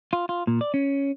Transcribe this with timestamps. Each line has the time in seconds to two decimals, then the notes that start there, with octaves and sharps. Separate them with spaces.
0.13 F4
0.29 F4
0.47 A#2
0.61 D5
0.74 C#4